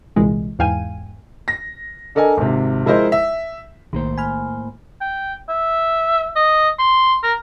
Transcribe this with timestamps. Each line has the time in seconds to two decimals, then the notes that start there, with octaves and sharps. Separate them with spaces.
0.16 C2 A#2 E3 G#3
0.59 E2 G#2 F5 G5 G#5 D#7
1.48 A#6
2.15 D4 A4 A#4 D#5 G#5
2.37 G#1 C3
2.85 F3 G#3 E4 A#4 C5 D#5
3.12 E5
3.93 B1 A2 D#3 A#3 C5
4.18 G#5 B5 F6
5.01 G5
5.49 E5
6.36 D#5
6.79 C6
7.23 A#4